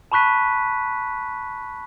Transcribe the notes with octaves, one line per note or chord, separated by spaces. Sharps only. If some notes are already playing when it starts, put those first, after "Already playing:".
A5 B5 C#6 F#6 B6 D#7